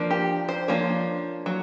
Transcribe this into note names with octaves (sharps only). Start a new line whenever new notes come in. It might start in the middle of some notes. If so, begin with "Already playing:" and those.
Already playing: F3 A#3 D4
G4
C5
F3 A#3 D4 C#5
F#3